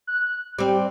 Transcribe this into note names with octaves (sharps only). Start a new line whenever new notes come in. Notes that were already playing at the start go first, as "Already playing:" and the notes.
F#6
G3 C4 G4